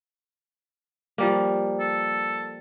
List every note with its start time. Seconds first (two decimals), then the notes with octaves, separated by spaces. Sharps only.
1.18 F3 G3 A#3
1.80 A4